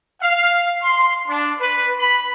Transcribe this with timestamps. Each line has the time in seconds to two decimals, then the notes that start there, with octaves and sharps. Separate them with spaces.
0.21 F5
0.83 C6
1.27 D4
1.59 B4
1.97 B5